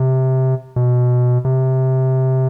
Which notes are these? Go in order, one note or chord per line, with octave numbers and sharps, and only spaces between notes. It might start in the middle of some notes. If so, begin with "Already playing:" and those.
Already playing: C3
B2
C3